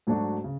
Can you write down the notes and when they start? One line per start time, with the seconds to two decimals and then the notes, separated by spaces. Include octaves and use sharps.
0.07 G#2 F#3 A3 D4 F#4
0.44 C#3